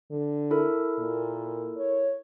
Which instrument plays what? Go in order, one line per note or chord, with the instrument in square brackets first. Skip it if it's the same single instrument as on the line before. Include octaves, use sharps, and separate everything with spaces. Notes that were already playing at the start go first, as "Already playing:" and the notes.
[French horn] D3
[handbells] E4 A4 A#4
[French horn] A#2
C#5